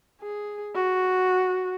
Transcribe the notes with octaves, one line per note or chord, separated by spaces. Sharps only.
G#4
F#4